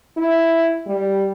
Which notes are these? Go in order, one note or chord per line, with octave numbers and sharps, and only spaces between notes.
E4
G3